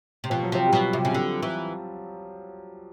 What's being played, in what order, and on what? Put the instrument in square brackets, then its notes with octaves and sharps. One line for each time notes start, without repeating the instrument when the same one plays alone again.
[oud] C3
[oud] B2 [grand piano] F3
[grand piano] F#3
[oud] C3 [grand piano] F3
[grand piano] G3
[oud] B2 [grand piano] F#3
[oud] C3
C#3
D3
E3